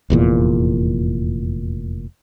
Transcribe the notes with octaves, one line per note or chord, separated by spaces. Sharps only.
F1 E2 A#2